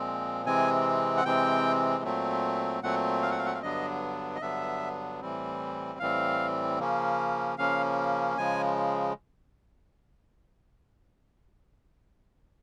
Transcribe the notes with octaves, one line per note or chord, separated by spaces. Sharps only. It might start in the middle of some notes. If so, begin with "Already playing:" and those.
Already playing: A#2 F3 G#3 C4
C3 E3 G#3 C4 G#5
F#5
C3 E3 G#3 C4 G5
A#2 F#3 A3 C4
A#2 F#3 A3 C4 F#5
F5
F#5
F5
F#5
F5
G2 D3 F#3 B3 D4 D#5
D#5
G2 D3 F#3 B3 D4 E5
A2 E3 G3 C4
A2 E3 G3 C4 F5
C#3 F3 A#3 C#4
C#3 F3 A#3 C#4 F5
C#3 F3 G#3 G#5